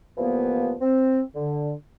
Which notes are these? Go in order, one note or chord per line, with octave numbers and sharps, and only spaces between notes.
C2 E3 F3 A#3 B3
C4
D3